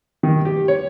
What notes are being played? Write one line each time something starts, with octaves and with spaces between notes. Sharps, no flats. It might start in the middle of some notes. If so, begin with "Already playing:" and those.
D#3
G4
C#5